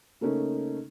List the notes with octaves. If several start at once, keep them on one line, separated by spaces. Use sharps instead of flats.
C#3 A3 A#3 C#4 D#4